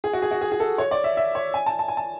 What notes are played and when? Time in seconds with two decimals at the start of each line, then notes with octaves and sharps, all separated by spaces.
0.04 G#4
0.13 F#4
0.22 G#4
0.31 F#4
0.41 G#4
0.52 G#4
0.60 A4
0.78 C#5
0.91 D5
1.04 E5
1.17 E5
1.35 C#5
1.54 G#5
1.66 A5
1.79 A5
1.88 G#5
1.97 A5